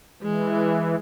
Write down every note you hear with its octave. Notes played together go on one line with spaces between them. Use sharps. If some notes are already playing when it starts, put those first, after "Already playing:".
E3 G#3